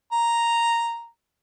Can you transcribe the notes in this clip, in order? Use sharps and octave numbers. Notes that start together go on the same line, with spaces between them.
A#5